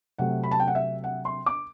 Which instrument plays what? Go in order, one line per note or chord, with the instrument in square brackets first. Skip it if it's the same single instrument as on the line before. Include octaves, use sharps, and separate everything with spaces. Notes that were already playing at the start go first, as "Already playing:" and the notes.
[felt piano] C3 F#3 A3 F#5
B5
A5
G5
F#5
E5
F#5
C6
D6